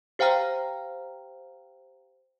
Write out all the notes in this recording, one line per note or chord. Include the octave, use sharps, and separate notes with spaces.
G4 C5 F5 G5 A#5 F6